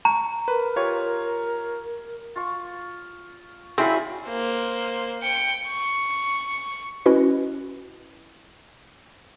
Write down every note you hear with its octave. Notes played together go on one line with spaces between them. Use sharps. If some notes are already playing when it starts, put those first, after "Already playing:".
A#5 C#6
A#4 B4
F4 G4 C#5
F4 C#6
F#3 C4 E4 G#4 D5 F5
A#3 C5
G5 C#7
C#6
C#4 E4 F#4 B4 D#5